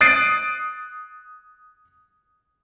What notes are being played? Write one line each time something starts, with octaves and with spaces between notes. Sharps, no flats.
D#6 F#6 A6 C7 D7 D#7